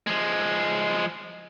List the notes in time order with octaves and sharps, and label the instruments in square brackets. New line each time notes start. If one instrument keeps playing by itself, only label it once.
[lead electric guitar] F3 G#3